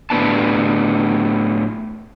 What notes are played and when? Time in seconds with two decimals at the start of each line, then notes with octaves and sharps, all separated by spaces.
0.10 A2 C#3 B3 D4 A5